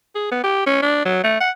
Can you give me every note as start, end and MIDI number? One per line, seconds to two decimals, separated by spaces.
0.15 0.31 68
0.31 0.40 59
0.44 0.62 67
0.66 0.82 61
0.82 1.04 62
1.05 1.20 54
1.24 1.40 57
1.40 1.50 78